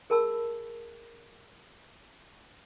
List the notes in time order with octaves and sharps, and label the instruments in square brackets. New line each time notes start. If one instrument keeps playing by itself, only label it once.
[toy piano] G#4 A#4 A5 B5 E6